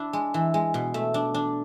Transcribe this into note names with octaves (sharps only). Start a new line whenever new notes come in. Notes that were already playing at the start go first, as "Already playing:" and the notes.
Already playing: D4 E4
G#3
E3
G#3
B2
A3
D4
D4